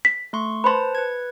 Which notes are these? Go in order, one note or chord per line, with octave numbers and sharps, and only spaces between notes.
B6
A3 C6 C#6
B4 C5 A5 B5 C6
B4 G#6